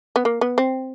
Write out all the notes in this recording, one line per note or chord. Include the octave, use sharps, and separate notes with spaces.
B3
A#3
B3
C4